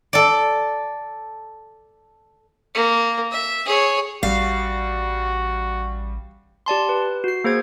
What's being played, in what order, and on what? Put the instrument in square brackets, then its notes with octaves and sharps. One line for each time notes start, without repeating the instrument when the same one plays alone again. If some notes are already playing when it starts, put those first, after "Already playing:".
[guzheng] A4 D5
[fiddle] A#3
E5
G#4 C#5
[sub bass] A1 [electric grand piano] G3 [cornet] F#4 [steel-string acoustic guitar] F5
[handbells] G4 D5 A5 C6
B4
F#4 C7
A#3 G#4 C5 G#6